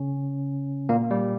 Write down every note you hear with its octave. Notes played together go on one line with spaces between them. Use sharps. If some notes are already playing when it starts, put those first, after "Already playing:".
Already playing: C#3 C#4
A#2 A#3
G3